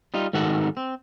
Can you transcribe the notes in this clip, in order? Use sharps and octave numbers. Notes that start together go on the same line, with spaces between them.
G3 D#4 F4
G#2 D#3 F#4 A4 F#5
C4